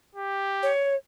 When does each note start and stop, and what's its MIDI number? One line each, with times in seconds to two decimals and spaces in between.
0.15 0.73 67
0.62 0.94 73